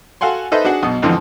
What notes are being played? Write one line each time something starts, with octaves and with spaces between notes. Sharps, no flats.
F#4 A4 F5 F#5 G#5 C6
D#4 A4 B4 C5 D#5 E5
D4 F#4 G#4 F#5
B1 B2 D#6
F2 G#2 D3 E3 F3